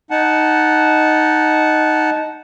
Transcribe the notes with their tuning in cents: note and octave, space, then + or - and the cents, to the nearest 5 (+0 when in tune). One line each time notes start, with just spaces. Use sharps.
D#4 +0 F#5 +0 A5 -15